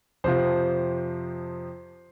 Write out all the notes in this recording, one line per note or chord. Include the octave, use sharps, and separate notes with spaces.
F2 C3 F3 C5